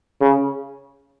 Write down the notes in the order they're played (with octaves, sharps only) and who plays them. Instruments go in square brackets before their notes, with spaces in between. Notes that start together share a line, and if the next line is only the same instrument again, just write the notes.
[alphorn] C#3